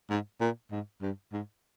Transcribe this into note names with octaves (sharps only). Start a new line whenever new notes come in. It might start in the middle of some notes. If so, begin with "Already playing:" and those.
G#2
A#2
G#2
G2
G#2